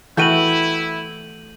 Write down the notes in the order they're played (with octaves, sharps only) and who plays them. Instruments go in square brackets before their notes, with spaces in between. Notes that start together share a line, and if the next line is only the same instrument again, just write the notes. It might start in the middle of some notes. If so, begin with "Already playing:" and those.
[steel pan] E3 [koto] A3 F#4 G5 [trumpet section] E4 [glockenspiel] G6 D#7 F#7